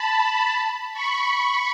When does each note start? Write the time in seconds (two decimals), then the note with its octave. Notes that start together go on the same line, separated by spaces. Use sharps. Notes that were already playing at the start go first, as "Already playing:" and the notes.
Already playing: A5 B5
0.93 B5 C#6